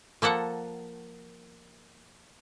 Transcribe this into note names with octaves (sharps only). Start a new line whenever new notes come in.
F3 A#3 A4 F#5